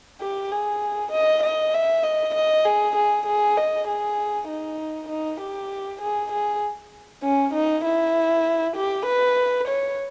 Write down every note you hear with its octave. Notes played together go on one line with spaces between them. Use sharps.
G4
G#4
D#5
D#5
E5
D#5
D#5
G#4
G#4
G#4
D#5
G#4
D#4
D#4
G4
G#4
G#4
C#4
D#4
E4
G4
B4
C#5